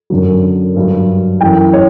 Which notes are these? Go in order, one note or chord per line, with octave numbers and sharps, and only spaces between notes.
F#2 D3 F#3
G2 F#3
F#2 E3 G5
C#5